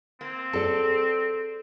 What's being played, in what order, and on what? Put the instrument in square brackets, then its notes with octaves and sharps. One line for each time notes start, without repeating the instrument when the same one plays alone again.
[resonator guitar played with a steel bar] A#3 [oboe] C4
[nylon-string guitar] G#4 D5 [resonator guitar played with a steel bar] A4